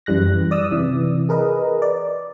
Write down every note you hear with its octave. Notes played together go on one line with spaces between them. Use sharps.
F#2 E3 G3 F#6 A#6
D5 D#6 E6
C3 E3
G#4 A#4 B4 D#5
D5